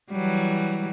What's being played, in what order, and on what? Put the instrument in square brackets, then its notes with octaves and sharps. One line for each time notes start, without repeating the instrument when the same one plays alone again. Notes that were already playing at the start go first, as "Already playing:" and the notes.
[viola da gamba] E3 F#3 G3